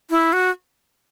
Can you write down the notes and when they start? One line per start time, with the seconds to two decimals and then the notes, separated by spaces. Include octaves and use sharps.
0.10 E4
0.33 F#4